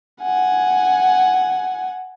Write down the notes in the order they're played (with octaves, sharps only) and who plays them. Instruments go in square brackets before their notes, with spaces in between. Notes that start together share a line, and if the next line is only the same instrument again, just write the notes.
[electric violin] F#5 G#5